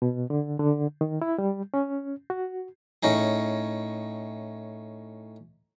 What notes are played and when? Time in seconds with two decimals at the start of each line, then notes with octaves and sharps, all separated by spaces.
0.02 B2
0.30 D3
0.59 D3
1.01 D#3
1.22 E4
1.38 G3
1.74 C#4
2.30 F#4
3.03 A2 C#4 D#4 G#4